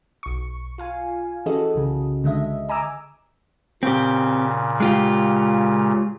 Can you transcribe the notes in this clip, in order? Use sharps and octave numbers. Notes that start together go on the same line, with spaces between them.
B1 C#6
F4 F5 G#5
E3 C#4 F#4 G#4 A4 D#5
C2 C#3
D3 G#3 D#5 E5
D#5 G#5 A#5 D6 E6
A#2 C#3 C4 G4
G#3 F4 G4